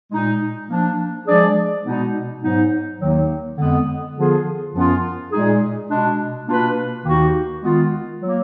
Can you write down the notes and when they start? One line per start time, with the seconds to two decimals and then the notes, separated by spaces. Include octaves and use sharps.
0.11 A#2 G#3 D#4
0.69 F3 A#3 D4
1.27 F3 G#3 D4 G#4 D5
1.85 B2 G#3 B3 D#4
2.42 G#2 F#3 B3 D#4
3.00 D#2 D#3 F#3 A#3 D#4
3.58 F2 D3 G#3 B3
4.15 D3 F3 B3 F4 G#4
4.74 F#2 F3 B3 F4
5.31 A#2 G#3 D#4 G#4
5.89 B2 G#3 D4
6.47 B2 A#3 D4 F4 B4
7.05 D#2 D#3 A#3 D#4 F#4
7.62 D#3 G#3 B3 F4
8.22 F#3 A#3